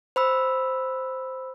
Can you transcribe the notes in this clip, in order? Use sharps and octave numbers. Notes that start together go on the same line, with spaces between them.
C5 B5 E6